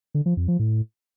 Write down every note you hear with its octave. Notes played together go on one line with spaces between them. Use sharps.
D3
F3
F2
F3
A2